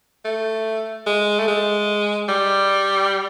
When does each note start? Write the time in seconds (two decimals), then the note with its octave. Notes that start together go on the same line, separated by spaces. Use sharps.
0.25 A3
1.07 G#3
1.39 A3
1.48 G#3
2.29 G3